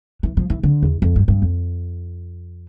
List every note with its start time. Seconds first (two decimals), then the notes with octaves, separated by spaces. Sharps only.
0.23 E3
0.37 F3
0.50 E3
0.63 D3
0.83 E2
1.02 F2
1.16 G2
1.28 G2
1.42 F2